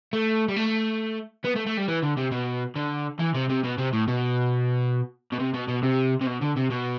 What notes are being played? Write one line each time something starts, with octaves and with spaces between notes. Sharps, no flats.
A3
G3
A3
B3
A3
A3
G3
E3
D3
C3
B2
D3
E3
C3
C3
B2
C3
A2
B2
B2
C3
B2
B2
C3
C3
B2
D3
C3
B2